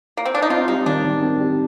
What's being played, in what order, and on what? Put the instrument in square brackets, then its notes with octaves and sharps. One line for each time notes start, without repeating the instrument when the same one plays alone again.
[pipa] A#3
C4
D4
D#4
[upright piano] C4 [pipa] F4
[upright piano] G3 [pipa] D#4
[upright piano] D#3 [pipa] D4
[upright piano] D#3
C4
G3